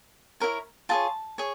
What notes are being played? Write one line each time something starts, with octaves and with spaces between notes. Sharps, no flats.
E4 G4 A#4 C#5
F4 G#4 C#5 A5
G#4 C#5